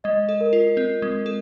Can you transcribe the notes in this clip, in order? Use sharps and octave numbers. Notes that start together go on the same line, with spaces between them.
G#3 D#5
A4
A#4
F4
C4
G#3
A4